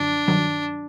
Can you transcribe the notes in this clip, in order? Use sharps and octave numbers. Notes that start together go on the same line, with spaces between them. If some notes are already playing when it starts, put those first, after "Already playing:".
Already playing: F#2 D3 F3 D4
G2 D#3 F#3